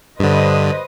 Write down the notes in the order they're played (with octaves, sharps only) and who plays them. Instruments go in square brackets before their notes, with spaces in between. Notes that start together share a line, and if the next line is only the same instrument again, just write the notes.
[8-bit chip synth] G2 D3 [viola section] B4 C5 D#5